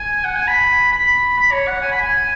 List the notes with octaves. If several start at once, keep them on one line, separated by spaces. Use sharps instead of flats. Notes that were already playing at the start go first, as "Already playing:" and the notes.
Already playing: G#5
F#5
G#5
B5
B5
B5
C#5
F#5
G#5
B5
G#5